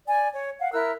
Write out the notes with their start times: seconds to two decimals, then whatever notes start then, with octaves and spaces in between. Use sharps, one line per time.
0.07 D5 G#5
0.33 C#5
0.60 F5 F#5
0.73 E4 A#4 E6 F#6